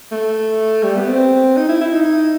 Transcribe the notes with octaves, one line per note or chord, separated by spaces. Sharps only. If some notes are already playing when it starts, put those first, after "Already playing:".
A3
G3
B3
C4
D#4
E4
E4
D#4